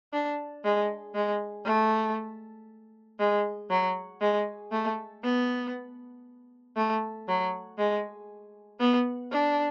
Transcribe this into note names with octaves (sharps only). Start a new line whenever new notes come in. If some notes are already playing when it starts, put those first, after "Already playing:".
D4
G#3
G#3
A3
G#3
F#3
G#3
A3
B3
A3
F#3
G#3
B3
D4